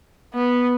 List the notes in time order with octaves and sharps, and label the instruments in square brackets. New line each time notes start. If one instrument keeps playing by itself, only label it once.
[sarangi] B3